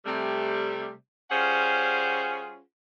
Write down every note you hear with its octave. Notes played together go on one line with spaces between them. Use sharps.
C3 G3 A3
G3 C#4 F4 G#4 C5 F#5